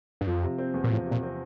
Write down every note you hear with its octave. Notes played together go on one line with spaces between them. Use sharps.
G2
F2 F3
C3
C4
E2
A#2
A2 F3
C3
A#2
C4